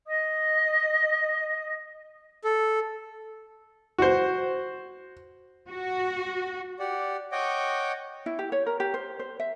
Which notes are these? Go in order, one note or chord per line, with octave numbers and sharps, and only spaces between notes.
D#5 D#6
A4
F#4 C5
F#4
G4 D5 F#5
C#5 D#5 F#5 G5 D6
E4
G4
C#5
A#4
G4
C5
C5
E5